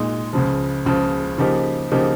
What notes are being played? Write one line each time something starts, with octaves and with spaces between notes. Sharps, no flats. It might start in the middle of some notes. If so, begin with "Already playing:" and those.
Already playing: A#2 G#3 D#4
C#2 C#3 F3
C#2 C#3 F3
C#3 F3 A#3 D#4 G4
C#3 F3 A#3 D#4 G4